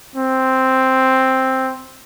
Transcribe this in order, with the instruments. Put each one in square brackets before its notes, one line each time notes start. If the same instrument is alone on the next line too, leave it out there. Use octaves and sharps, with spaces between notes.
[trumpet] C4